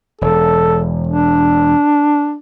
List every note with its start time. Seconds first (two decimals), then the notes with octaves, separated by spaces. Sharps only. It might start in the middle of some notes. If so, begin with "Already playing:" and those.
0.21 E1 A4
1.07 D4